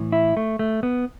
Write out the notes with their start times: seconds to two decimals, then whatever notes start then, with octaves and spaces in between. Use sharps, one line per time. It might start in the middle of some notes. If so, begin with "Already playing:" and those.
Already playing: A2 E3
0.12 E4
0.37 A3
0.59 A3
0.83 B3